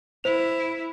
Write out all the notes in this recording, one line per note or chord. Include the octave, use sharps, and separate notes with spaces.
E4 C5 F7